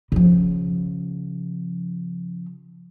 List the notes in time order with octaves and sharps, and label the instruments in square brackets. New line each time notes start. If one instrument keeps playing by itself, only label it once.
[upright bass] C#3 F3